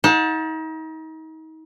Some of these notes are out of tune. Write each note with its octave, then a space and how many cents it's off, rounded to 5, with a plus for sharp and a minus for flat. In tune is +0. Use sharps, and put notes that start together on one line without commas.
D#4 +35 F#5 -30 A5 +0